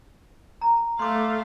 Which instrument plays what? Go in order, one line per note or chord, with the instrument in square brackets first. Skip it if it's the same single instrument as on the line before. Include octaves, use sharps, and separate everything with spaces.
[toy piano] A#5
[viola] A3 F5 [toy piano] C6 D6